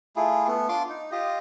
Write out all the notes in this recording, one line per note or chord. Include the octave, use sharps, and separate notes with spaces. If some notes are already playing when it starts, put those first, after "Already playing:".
A3 E4 F4 G#4
A3 B3
D4 F4 C6 D6
D#4
F4 G4 D#5